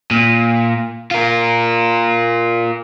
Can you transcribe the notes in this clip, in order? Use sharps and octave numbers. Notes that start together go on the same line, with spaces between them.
A#2
F4 A#4